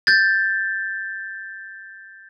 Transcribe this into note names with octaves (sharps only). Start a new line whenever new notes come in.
G6 A6